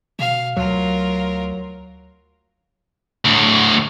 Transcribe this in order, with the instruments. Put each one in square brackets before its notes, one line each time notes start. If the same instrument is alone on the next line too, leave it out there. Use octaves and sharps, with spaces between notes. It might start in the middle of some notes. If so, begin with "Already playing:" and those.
[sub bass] B2 [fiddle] F5
[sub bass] D2 [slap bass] F#3 [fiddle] F4 A#4
[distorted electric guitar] D2 A2